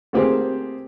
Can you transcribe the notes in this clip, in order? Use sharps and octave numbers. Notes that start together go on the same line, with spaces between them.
A3 A#3 C4 G4 G#4 C5